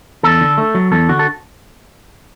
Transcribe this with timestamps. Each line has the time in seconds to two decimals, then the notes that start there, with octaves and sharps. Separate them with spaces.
0.23 E2 A4
0.41 D3
0.58 A3
0.75 F#3
0.92 E2 A4
1.09 D3 F#4
1.19 A4